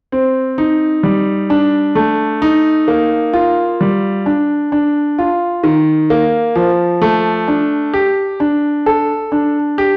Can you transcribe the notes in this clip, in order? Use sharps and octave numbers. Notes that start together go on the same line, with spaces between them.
C4
D#4
G3
D4
A3
D#4
A#3
F4
G3
D4
D4
F4
D#3
A#3
F3
A3
D4
G4
D4
A4
D4
G4